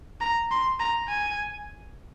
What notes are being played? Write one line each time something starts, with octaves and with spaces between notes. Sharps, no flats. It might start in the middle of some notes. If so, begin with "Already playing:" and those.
A#5
C6
A#5
G#5